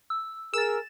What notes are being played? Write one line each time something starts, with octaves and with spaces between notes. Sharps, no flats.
E6
G#4 A#4 E6 A6 E7